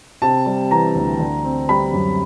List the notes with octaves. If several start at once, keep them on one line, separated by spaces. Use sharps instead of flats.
C3 A5
G3
E3 A#5
D2
D3
C4
G3 B5
F#2